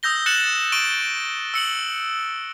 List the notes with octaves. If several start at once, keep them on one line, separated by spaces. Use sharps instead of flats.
D#6 E6 G6 A#6 G7
F#6 A6 C#7 E7 F#7
C#6 D7 D#7 F#7 G7
E6 C#7 F#7